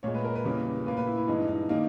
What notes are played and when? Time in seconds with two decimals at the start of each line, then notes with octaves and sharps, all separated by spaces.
0.03 A#2 G#3 C#5
0.14 B4
0.24 A#4
0.35 B4
0.45 E2 C#3 G3 A#3
0.86 A#2 A#3 B4
0.97 B4
1.07 E4
1.18 E4
1.27 G2 E3 G#3 D#4
1.48 D#4
1.69 D#3 G3 A#3 D#4